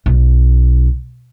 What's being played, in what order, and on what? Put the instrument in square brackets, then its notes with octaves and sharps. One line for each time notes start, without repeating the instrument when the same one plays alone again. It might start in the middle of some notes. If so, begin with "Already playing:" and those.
[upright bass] B1